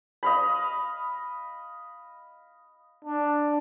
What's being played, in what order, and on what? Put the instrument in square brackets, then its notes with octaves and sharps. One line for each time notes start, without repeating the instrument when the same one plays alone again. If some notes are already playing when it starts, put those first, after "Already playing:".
[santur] D#5 F5 B5
[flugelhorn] D4